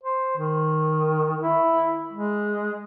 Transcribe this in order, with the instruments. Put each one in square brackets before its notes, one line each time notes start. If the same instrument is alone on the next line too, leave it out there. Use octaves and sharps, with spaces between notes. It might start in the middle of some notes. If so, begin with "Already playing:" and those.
[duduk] C5
D#3
E4
G#3